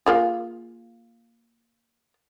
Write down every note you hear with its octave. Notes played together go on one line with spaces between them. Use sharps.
A#3 F4 G#4